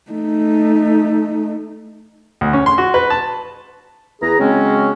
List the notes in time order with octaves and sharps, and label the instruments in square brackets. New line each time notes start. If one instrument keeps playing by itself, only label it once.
[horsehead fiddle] A3 D#4
[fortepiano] D2
C#4
C6
F#4
B4
A5
[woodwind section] E2 E3 G#4 B4 A#5
C#3 F#3 G#3 C4 C#4